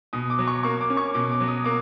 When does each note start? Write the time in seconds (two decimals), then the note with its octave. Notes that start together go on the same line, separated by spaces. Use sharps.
0.13 B2 D#6
0.30 D6
0.39 F#3
0.47 C#6
0.63 A#3 C#6
0.81 D6
0.90 C#4
0.97 C#6
1.14 B2 D6
1.31 D6
1.40 F#3
1.48 D#6
1.64 A#3 D6